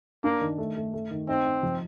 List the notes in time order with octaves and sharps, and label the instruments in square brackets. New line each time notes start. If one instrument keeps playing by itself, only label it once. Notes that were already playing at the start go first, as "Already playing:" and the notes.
[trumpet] A#3 [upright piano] D4
[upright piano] D#3
A3
A3
A3
D#3
[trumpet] C4 [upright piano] D#4
[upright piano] D#4
F3